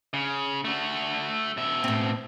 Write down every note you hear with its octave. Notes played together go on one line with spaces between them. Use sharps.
C#3
A3 F#4
B2 E5
A2 C4